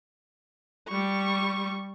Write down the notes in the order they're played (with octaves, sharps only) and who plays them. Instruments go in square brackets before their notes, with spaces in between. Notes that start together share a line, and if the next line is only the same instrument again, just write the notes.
[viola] G3 C#6